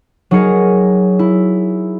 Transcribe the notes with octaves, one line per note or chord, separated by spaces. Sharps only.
F#3 D#4 G#4 A#4 C#7
E4